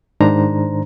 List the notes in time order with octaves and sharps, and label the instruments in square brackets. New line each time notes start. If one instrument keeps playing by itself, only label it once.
[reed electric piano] G#2 D#3 D4 C5 A#5